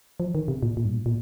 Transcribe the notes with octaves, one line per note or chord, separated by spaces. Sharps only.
F3
D#3
C3
A#2
A#2
G2
A#2
A#2